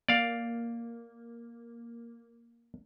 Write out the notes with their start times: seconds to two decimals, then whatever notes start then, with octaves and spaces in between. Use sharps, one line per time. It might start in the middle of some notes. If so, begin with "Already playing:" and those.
0.09 A#3 D5 F5